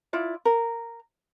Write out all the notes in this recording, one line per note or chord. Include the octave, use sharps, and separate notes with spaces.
E4 F4 D5
A#4